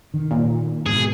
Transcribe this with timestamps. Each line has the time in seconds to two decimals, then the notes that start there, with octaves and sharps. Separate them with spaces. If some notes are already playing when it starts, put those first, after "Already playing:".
0.14 D#3
0.31 A#2
0.86 G#2 B2 G#4